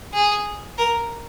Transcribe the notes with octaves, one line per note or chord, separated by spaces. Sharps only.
G#4
A#4